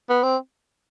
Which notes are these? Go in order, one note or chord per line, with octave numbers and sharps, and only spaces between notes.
B3
C4